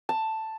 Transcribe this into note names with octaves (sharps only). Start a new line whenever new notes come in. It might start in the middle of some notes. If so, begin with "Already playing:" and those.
A5